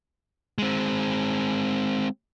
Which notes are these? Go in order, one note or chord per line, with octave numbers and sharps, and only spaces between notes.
G#3 C4